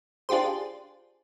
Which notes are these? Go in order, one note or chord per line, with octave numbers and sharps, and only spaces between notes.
D4 F4 G4 G#4 C5